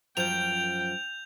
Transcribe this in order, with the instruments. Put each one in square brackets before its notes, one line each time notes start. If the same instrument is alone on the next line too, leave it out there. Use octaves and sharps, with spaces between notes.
[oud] F#2 F3 [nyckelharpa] G5 [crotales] G6 F7